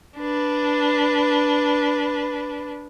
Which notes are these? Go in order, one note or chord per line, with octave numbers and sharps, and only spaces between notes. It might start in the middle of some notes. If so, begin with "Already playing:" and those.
D4 B4